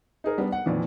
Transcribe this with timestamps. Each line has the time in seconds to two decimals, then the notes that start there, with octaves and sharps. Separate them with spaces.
0.24 D#4 G#4 A#4
0.38 G3 B3 D4
0.52 F#5
0.66 F2 A#2 D#3 E3